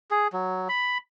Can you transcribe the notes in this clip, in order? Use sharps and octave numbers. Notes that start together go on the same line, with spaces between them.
G#4
F#3
B5